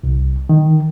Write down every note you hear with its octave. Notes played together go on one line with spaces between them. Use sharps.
C2
D#3